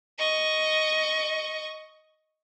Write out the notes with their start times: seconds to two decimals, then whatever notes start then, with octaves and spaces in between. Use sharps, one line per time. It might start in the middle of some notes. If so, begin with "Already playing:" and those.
0.18 D#5 C#6